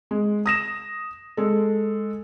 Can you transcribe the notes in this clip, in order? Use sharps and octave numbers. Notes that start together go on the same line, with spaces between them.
G#3
D#6 A#6 E7
G#3 A4